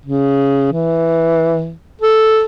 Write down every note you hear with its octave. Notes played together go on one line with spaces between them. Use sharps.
C#3
E3
A4